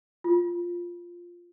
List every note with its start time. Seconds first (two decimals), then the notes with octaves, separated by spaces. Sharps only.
0.24 F4